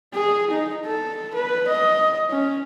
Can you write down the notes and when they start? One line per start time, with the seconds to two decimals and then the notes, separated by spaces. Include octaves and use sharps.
0.14 G#4
0.51 D#4
0.85 A4
1.34 B4
1.68 D#5
2.30 C#4